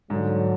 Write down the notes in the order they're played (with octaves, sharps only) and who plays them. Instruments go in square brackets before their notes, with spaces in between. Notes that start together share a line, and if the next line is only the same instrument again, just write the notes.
[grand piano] G#2 [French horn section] D3 F#3